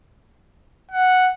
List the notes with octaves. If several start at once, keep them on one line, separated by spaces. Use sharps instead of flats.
F#5